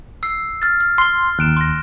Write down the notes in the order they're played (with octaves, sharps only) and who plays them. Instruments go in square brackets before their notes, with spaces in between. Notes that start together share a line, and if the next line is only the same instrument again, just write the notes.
[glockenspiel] E6 C7
F6 A6
F6
[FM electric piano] C6 [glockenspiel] F6 G7
[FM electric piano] D#2 [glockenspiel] F#6 D7 E7
[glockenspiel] C6 A#6